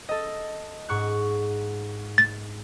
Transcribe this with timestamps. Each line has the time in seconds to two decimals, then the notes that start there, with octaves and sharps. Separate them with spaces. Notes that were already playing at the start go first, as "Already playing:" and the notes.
0.09 A4 D#5
0.89 G#2 C#6 F#6
2.18 A6